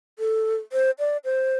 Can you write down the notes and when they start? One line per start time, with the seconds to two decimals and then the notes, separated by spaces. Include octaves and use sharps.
0.19 A4
0.73 C5
0.99 D5
1.25 C5